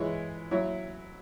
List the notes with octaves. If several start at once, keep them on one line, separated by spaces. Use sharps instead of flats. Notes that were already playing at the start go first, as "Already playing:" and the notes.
Already playing: E3 G#3 E4 C#5
F#3 E4 C#5